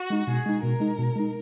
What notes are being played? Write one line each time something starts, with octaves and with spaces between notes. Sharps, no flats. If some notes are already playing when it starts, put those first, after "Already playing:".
Already playing: F#4
G#3 D#4
B2 G#4
G#3 D#4
B2 A#4
G#3 D#4
B2
G#3 D#4